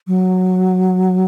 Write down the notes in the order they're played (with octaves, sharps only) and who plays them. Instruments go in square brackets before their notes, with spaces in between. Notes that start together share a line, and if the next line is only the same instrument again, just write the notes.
[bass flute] F#3